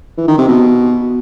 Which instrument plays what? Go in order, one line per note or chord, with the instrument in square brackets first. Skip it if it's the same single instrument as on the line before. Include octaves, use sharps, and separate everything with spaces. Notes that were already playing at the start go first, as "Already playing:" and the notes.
[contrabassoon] E3
D#3
C3
B2